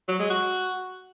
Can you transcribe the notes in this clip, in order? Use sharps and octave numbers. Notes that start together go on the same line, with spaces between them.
F#3
G#3
F#4